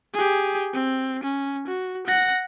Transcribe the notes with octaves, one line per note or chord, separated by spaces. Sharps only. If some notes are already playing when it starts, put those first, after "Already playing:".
G4 G#4
C4
C#4
F#4
F#5 A#6